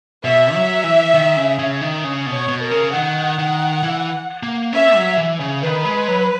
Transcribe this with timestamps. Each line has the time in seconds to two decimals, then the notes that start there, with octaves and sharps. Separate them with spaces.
0.24 B2 E5
0.54 F#3
0.84 E3
1.14 D#3
1.37 C#3
1.59 C#3
1.81 D#3
2.04 C#3
2.26 B2
2.34 C#5
2.48 B2
2.64 A#4
2.71 C#3
2.93 D#3 F#5
3.38 D#3
3.83 E3
4.43 A#3
4.73 C#4 E5
4.95 F#3
5.18 E3
5.40 C#3
5.62 D#3 B4
5.85 G#3
6.08 F#3